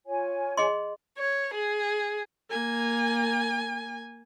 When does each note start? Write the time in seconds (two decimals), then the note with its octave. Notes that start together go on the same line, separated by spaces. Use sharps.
0.07 F4 C#5 G#5
0.57 G#4 D#5 C6
1.18 C#5
1.54 G#4
2.50 A#3 G#5